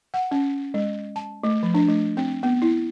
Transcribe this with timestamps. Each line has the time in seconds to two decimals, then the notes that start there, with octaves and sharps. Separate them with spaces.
0.14 F#5
0.31 C#4
0.74 G#3
1.16 A5
1.44 A3
1.63 F3
1.74 D4
1.88 A3
2.17 C4
2.43 B3
2.62 E4